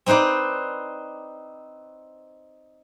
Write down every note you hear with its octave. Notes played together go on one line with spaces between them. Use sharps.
C4 D#4 B4 C5 D5